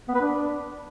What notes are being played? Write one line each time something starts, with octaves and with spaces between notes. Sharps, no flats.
B3
B4
D4